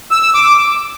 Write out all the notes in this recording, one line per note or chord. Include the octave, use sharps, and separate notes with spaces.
E6
E6
D6